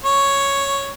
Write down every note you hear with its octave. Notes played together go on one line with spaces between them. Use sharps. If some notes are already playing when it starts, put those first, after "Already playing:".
C#5 C#6